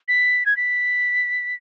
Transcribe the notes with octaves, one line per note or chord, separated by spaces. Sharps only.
B6
G#6
B6